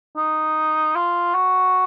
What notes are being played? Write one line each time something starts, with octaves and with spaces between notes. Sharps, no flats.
D#4
F4
F#4